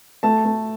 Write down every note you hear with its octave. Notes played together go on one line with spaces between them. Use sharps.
A3 A5
A3